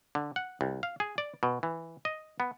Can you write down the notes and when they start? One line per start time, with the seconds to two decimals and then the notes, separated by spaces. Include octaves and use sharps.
0.15 D3
0.36 F#5
0.61 C2
0.83 F5
1.00 G#4
1.18 D5
1.43 B2
1.63 E3
2.05 D#5
2.40 B3